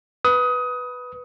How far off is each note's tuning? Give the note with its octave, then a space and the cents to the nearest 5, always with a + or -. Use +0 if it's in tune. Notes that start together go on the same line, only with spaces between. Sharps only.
B4 +0 D#6 +20